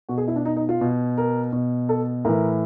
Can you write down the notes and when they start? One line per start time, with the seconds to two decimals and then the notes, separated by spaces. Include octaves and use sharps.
0.09 B2 F#4
0.17 G#4
0.28 E4
0.36 D4
0.45 D#4
0.56 D#4
0.69 F4
0.81 B2
1.18 A#4
1.53 B2
1.89 A4
2.25 A2 E3 A#4